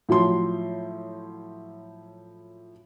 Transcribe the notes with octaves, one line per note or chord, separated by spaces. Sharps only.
A2 F3 F#3 C6